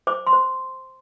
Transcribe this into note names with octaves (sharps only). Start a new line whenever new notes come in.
C5 D6
C6
C5